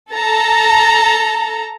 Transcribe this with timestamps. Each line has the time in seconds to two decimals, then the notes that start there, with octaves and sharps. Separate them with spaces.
0.11 A4 A5 A#5